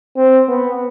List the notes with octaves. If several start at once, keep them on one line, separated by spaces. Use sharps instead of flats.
C4
B3